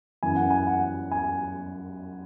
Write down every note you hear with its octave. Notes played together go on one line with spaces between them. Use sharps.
F#2 E3 G#5
F#5
G#5
F#5
G#5